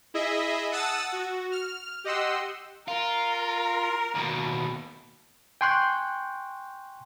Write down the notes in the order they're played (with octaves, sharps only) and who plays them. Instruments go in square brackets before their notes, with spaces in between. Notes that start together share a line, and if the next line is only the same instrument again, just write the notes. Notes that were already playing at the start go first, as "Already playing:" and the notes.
[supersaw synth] E4 G#4 D#5 E5
F#5 A5 D#6 E6 A6
F#4
F6
G4 D#5 F#5 C6 E6
[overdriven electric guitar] F4 [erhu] A#4
[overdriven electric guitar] D#2 B2
[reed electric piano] G5 G#5 C6 C#6 F#6 G6